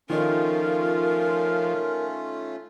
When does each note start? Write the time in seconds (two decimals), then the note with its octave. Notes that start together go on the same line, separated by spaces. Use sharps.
0.10 D#3 F3 A3 C#4 D#4 F4 A#4